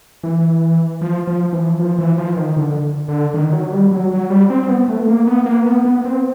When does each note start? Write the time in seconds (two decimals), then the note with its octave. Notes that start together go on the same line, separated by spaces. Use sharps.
0.23 E3
1.01 F3
1.27 F3
1.53 E3
1.79 F3
1.98 E3
2.18 F3
2.37 D#3
2.57 D3
3.08 D3
3.34 D#3
3.53 F#3
3.72 G3
3.91 F#3
4.11 F#3
4.30 G3
4.50 C4
4.63 C4
4.69 B3
4.88 A3
5.08 A#3
5.27 B3
5.46 A#3
5.66 B3
5.85 B3
6.05 C4